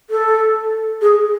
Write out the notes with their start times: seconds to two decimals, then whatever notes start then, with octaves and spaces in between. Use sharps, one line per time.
0.10 A4
1.02 G#4